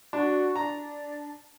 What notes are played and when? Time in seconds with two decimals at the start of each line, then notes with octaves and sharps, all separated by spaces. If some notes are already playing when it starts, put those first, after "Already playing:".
0.13 D4 F#4
0.56 D4 A#5